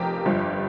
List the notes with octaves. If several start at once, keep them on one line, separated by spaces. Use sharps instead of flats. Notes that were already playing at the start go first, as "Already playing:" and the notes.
Already playing: F1 F2 F3 G4 A#4
G1 G2 F3